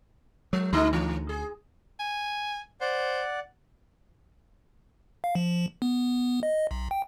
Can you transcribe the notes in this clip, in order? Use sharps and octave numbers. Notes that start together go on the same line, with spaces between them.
F#3 G#3
D2 G3 D#4
E3
G#4
G#5
C5 D5 F#5
F5
F3
B3
D#5
B1
G5